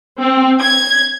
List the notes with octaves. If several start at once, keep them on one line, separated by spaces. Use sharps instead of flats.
C4
G#6